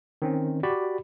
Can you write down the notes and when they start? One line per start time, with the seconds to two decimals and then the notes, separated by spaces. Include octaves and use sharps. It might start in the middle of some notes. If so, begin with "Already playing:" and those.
0.22 D#3 C4 C#4
0.63 F#4 G4 D5 B5